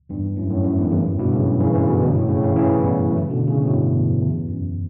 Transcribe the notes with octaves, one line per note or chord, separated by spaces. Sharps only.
E2 G2
F#2 A2
F#2 A2
F#2 A2
E2 G2
A2
E2 G2
F#2 A2
G2 B2
A2 C#3
F#2
C#3 E3
C#3 E3
B2 D3
G2 B2
F#2 A2
A2 C#3
C#3 E3
C#3 E3
G3 B3
F#3 A3
B2 D3
A2 C#3
A2
G2 B2
E2
E2
F#2